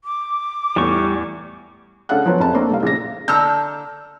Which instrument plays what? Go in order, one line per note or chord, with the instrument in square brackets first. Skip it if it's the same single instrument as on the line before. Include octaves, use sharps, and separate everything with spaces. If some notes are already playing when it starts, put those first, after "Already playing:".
[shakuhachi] D6
[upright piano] E2 A2 [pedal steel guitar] G3 C#6
[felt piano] C#3 D4 A4 F5 F#5 F#6
F3 F#3 B3 C#4
F1 C#4 A5
A3 A#3 C4 D4
C2 F5
A#1 C#3 A#6
[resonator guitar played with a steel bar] D3 A5 A#5 [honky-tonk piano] E6 F6 G6